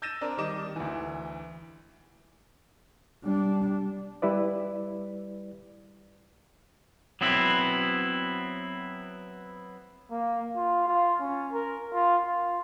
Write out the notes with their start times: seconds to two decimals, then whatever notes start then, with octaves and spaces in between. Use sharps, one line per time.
0.02 E6 G6 A6 A#6 D#7 E7
0.21 C4 D4 A#4
0.37 D#3 G3 D#5 D6 E7
0.76 D2 E3
3.24 G3 D4
4.22 G3 E4 B4 D5
7.21 F#3 B3 C4 E4
10.11 A#3
10.57 F4
10.88 F4
11.21 C#4
11.53 A#4
11.94 F4
12.26 F4